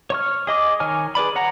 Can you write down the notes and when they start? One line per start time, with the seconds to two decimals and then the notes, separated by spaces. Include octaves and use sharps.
0.10 C#5 C#6 F6
0.47 G#4 D#5 D6 D#6
0.80 D#3 C#5 G#5 F6
1.15 G#4 B4 D5 B5
1.35 C#5 F#5 A#5